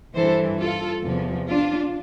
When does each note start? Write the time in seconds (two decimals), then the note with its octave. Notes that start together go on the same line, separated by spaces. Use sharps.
0.16 G2 E3 A4 C5
0.60 F4 A4
1.04 E2 C3 F3
1.49 D4 F4